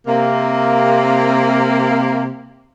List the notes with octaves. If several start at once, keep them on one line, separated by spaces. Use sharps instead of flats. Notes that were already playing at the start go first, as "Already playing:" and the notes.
C3 A#3